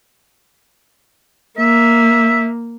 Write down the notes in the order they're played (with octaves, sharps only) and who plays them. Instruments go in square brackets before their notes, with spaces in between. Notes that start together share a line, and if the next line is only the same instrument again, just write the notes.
[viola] A#3 [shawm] E5